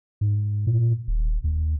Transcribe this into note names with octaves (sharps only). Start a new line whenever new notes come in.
G#2
A#2
D#1
D#2